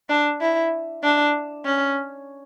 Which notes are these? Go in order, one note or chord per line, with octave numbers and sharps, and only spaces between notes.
D4
E4
D4
C#4